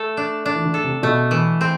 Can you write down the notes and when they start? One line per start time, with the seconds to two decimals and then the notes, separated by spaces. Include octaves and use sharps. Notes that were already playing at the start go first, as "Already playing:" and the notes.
Already playing: A3 A4
0.17 D4
0.46 D4
0.55 E3
0.65 D3
0.74 A4
0.84 C3
1.03 B2 A3
1.31 E3
1.61 C4